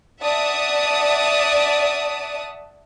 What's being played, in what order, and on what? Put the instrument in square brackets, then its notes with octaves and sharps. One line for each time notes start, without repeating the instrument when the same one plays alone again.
[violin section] D5 E5 F#5 A5 D#6